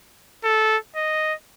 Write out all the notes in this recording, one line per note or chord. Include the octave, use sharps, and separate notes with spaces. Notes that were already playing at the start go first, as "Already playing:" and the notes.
A4
D#5